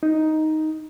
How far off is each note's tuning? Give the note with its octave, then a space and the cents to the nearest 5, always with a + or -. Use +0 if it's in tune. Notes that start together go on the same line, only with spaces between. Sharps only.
D#4 +5